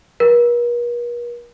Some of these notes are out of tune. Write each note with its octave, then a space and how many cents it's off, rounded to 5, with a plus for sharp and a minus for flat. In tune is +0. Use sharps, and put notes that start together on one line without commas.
A#4 +45